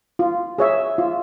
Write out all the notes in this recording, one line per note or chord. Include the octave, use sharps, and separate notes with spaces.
F4
G#4 C#5 E5
F4